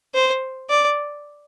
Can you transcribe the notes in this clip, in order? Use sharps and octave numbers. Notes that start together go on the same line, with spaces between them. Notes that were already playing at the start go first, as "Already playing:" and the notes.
C5
D5